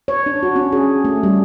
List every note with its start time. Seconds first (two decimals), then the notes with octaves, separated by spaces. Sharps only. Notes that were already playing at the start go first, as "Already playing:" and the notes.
0.08 C#5
0.26 D4
0.43 F#4
0.56 C#4
0.72 G#4
1.05 A3
1.23 G3